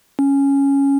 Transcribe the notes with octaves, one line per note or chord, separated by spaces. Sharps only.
C#4